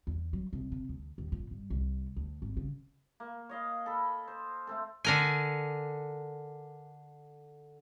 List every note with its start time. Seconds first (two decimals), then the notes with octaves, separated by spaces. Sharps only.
0.07 E2
0.33 F#3
0.53 C2
0.72 C3
0.89 D2
1.18 D#2
1.32 A#2
1.51 G2
1.70 C2
2.16 D2
2.42 G#1
2.57 C#3
3.20 A#3
3.49 C#5 D#5 F5
3.86 A4 B5
4.28 C5
4.67 A3 C4 A4
5.05 D3 A#4 G#5